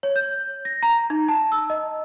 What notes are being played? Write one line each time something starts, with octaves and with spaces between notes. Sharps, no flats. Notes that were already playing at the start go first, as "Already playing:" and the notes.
C#5
G6
A#6
A#5
D#4
A5
E6
D#5